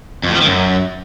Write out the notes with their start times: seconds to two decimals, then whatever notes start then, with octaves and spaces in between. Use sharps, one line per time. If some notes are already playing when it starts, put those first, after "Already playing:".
0.24 F2
0.29 A2
0.35 F3
0.41 D#3
0.47 F#2